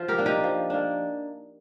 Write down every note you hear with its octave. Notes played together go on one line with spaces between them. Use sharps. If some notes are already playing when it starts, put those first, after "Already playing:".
Already playing: F3 F4
G4 A#4
A#3 D4
D#4 G4
F3
A#3 D4